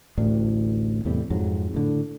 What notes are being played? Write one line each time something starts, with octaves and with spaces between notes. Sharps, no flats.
A1 D2 A2 D4
E2 A2 C3 G3
F2 G#2 F#3
A2 D3